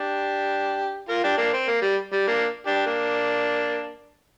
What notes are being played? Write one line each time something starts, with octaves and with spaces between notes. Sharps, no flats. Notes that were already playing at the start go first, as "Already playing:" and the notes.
Already playing: D4 G4
F4 A#4
D4 G4
A#3 D4
C4
A#3
G3
G3
A#3 D4
D4 G4
A#3 D4